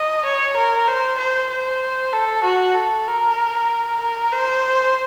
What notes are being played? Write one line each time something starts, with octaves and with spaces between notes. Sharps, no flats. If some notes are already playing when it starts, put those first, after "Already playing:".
Already playing: D#5
C#5
A#4
C5
C5
C5
A4
F#4
A4
A#4
A#4
C5